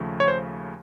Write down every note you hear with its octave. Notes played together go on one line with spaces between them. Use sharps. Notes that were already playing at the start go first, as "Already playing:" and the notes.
Already playing: D#2 C#3 F3 A3
C#5
C5